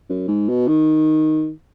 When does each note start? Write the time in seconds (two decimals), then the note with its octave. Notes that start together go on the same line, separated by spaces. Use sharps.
0.09 F#2
0.28 G#2
0.49 B2
0.68 D#3